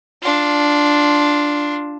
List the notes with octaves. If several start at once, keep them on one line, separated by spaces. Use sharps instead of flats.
D4 F4